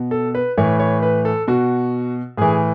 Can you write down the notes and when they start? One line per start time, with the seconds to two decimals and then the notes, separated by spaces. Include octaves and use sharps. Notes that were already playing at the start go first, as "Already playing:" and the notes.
Already playing: B2
0.11 A4
0.35 B4
0.58 A2 E3 C#5
0.79 C#5
1.03 B4
1.25 A4
1.47 B2 F#4
2.37 A2 E3 G#4